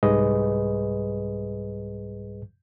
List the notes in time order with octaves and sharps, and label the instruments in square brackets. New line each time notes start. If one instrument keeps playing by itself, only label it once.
[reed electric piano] C2 G#2 G3 G#4 B4 D#5